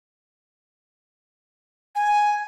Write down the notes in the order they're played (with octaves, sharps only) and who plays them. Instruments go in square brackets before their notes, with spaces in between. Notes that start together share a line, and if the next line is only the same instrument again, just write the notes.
[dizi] G#5